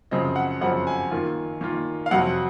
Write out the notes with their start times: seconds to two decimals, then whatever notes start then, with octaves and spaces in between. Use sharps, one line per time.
0.11 F#2 C#3 F3 C4 D#5
0.36 F#5
0.61 F#2 C#3 F3 C4 F#5
0.87 G#5
1.11 D#3 A#3 F4
1.61 D#3 A#3 F4
2.06 F5
2.11 F2 C3 F#3 C4 F#5